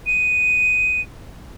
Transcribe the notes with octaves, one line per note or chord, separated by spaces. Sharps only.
D#7